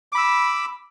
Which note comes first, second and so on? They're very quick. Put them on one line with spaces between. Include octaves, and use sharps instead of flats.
D6 B5 E6